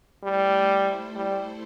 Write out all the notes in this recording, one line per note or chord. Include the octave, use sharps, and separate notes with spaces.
G3 A3 E4 A4 C5
G3